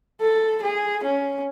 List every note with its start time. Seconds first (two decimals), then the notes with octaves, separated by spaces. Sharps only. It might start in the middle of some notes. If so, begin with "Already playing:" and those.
0.21 A4
0.63 G#4
1.03 C#4